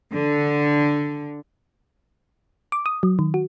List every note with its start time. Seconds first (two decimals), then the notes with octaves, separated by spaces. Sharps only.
0.13 D3
2.72 D6
2.86 D#6
3.03 F#3
3.19 D#3
3.34 F#4